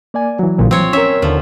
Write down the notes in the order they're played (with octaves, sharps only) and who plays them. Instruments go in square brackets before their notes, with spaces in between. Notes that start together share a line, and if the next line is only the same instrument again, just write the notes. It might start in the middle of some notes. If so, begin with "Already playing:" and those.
[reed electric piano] A#3 D5 G#5
E3 F#3
[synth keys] A#1 A#2 D3
[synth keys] F3 [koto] C4 C#5
[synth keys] C#4 [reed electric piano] A#4 C#5 [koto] E5
[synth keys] D#2 D3 [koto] F3